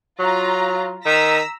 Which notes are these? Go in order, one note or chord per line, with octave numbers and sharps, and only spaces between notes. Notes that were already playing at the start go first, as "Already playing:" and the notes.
F#3 F4 A#5
D#3 A#5 E6 B6